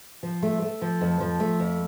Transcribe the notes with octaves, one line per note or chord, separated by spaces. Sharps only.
F3
A3
A3
F3
F2
F3
A3
F2